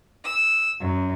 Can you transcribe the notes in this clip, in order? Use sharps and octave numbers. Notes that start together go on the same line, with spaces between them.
E6
F#2